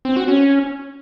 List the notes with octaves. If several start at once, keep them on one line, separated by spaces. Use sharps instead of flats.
C4
F#4
C#4